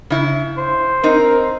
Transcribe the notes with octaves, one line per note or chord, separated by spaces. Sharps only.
C#3 E4
C5
C4 D#4 A#4